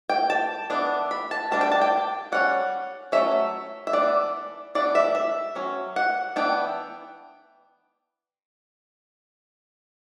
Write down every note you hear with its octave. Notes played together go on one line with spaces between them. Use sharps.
G5
A5
E3 B3 D4
B5
A5
G3 D4 A5
G5
A5
G5
G3 C#4 F#5
F#3 A3 C#4 E5
E5
E3 B3 D4 D5
E3 B3 D4 D5
E5
E5
F#3 C#4
F#5
E3 B3 D4 G5